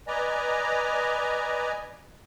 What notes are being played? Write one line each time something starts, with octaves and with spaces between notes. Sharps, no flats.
B4 D5 D#5 G#5 A#5